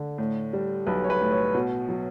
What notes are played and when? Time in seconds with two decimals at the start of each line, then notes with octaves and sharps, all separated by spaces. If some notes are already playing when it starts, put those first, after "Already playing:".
Already playing: D3
0.18 A2
0.53 G3
0.87 B1 B4
1.04 C#5
1.10 B4
1.21 A2
1.32 C#5
1.55 B2
1.89 F#3